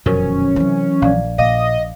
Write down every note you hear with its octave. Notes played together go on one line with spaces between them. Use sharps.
F1 F#2 B2 D#3 F3 C#4 A#4
C3 E3 F#3
A#1 D5 F5
A#2 D#5 F5 D6